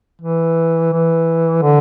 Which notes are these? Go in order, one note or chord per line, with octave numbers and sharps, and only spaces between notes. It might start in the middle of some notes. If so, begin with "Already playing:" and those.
E3
E3
D3